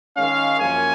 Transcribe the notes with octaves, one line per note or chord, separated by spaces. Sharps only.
D#3 G#3 C#4 F5
F#2 F3 A#3 C#4 G#5